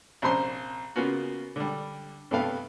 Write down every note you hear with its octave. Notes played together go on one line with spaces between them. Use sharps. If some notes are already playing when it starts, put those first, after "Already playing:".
A#1 C3 C#4 C5 A#5 C6
C#3 A#3 B3 C#4 F4 F#4
D3 G3
G2 C3 G3 A3 B3 F5